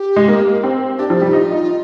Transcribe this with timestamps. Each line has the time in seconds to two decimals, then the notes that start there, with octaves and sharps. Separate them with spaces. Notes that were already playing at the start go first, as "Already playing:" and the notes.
Already playing: G4
0.16 G#3
0.28 A#3
0.63 C4
0.98 D4 G4
1.10 F3
1.16 G4
1.22 G3 D#4
1.33 D#4 F4
1.52 D#4